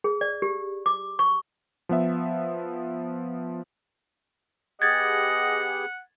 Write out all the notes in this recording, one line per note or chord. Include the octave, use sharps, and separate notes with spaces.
G#4
D5
G4
D6
C#6
F3 B3 E5
B3 G4 G#4 D#5 F#5 G#6 A6